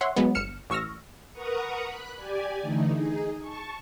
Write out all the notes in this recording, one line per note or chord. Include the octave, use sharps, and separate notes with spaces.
C#5 E5 F#5 C6
F#3 G#3 B3
G1 F6 C#7 E7
A1 C#6 E6 F6 A#6
A#4 B4 F#5 A#5 C#6 D#6
B5 F#6
G4 D5 G#5
D3 E3 A3 D#4
D#4 G#4
A5 C#6